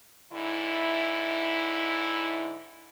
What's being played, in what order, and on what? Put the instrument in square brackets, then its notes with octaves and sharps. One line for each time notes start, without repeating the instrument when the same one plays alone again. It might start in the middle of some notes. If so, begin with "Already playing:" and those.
[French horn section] G#2 D3 E4